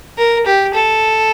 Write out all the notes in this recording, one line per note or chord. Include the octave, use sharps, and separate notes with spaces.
A#4
G4
A4